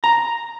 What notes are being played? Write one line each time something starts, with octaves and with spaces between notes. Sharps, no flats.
A#5